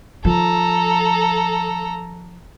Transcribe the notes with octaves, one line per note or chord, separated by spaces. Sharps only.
D#3 F3 A4 A#5